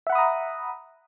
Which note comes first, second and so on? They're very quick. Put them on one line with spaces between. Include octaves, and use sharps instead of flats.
E5 F#5 B5 D#6 A#5